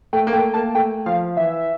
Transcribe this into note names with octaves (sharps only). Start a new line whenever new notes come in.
A3 G5
A#3
A3 G5
A#3 A5
A3 G5
F3 F5
E3 E5